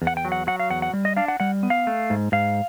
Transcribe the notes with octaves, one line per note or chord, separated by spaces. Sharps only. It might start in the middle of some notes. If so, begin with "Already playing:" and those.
E2
F#5
G5
F#3
F#5
F#3 F#5
F5
E2 F#5
F#5
G3
D#5
D4 F5
F#5
G3 F#5
B3
F5
A3
G#2
G#2 F5